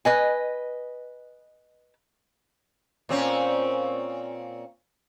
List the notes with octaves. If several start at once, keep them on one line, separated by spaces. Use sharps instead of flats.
B4 D#5 G#5
A#2 C4 C#4